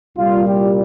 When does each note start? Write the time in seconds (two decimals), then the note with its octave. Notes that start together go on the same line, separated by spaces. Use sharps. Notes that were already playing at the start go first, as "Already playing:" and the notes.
0.16 C2 A#2 G3 F4
0.47 G4